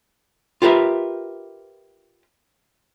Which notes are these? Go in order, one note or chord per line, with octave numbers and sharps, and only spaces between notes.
F4 G4 A#4 B4 E5